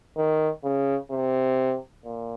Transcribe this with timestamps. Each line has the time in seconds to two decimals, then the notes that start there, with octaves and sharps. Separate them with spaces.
0.17 D#3
0.64 C#3
1.11 C3
2.05 A#2